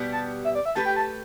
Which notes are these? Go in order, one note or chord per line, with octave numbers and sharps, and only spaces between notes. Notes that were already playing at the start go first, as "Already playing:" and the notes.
Already playing: B2 G3 B3 G4
A5
E5
D5
E5
A3 G4 B4 A5
G5
A5